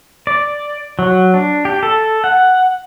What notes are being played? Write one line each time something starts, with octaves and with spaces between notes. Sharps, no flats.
D5
F#3
D4
G4
A4
F#5